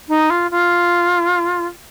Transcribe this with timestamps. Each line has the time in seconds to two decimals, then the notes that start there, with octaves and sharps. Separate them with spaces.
0.08 D#4
0.30 F4
0.51 F4